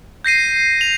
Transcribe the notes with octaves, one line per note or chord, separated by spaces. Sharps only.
G6 A#6 C7 D#7
F7